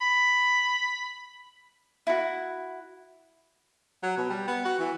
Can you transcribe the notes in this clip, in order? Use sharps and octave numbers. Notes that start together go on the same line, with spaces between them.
B5
E4 F#4
F#3
B2
G3
B3
F#4
E3